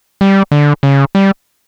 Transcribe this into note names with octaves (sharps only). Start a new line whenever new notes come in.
G3
D3
C#3
G3